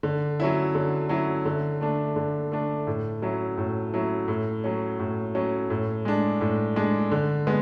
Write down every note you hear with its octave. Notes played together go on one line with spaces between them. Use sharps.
D3
F#3 C#4 E4
D3
F#3 C#4 E4
D3
A3 D4
D3
A3 D4
A2
F#3 C#4 E4
A2
F#3 C#4 E4
A2
F#3 C#4
A2
F#3 C#4
A2
G#3 D4
A2
G#3 D4
D3
G#3 B3